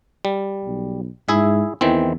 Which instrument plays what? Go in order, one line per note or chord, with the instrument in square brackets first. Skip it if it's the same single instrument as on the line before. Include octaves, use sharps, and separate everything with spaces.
[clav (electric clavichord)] G3
[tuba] B1
[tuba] G#2 [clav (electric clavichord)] E4 G#4 E5
[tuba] E2 [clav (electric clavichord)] D#3 E3 C4